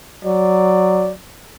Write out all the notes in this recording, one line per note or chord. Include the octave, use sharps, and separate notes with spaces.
F#3 D5